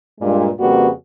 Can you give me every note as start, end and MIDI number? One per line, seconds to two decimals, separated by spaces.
0.21 0.48 43
0.21 0.48 46
0.21 0.48 56
0.60 0.89 41
0.60 0.89 49
0.60 0.89 55
0.60 0.89 58
0.60 0.89 66
0.60 0.89 71